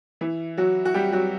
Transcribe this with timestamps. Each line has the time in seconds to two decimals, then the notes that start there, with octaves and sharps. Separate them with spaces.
0.21 E3 E4
0.57 F#3 F#4
0.85 F#4
0.94 G3 G4
1.13 F#3 F#4